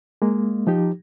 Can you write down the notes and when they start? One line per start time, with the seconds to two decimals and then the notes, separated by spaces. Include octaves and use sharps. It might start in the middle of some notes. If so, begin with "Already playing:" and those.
0.22 G#3 A#3
0.67 F3 D#4 G4